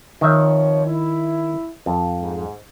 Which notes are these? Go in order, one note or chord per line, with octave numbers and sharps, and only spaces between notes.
D#3 F3 C4 C#5 E5
E4
F2
G#2